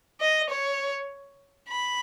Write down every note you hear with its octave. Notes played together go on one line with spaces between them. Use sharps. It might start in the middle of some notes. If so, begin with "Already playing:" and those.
D#5
C#5
B5